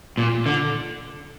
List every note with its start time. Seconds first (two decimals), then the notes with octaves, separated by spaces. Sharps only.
0.18 A#2
0.46 D3